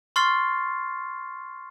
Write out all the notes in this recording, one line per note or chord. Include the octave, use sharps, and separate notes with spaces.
C6 C#6 F6 A6 C7